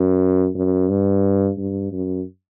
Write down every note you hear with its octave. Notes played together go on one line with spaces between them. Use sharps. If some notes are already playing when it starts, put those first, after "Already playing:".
Already playing: F#2
F#2
G2
G2
F#2